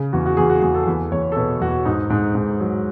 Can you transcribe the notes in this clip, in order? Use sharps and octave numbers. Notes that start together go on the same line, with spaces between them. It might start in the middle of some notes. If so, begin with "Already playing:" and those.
Already playing: C#3
E2 F#4
F#4
E2 G#4
F#4
E2 G#4
A4
E2 B4
E2 C#5
A4
B2 B4
E2 F#4
G#2 D#4
G#2
G#2
F#3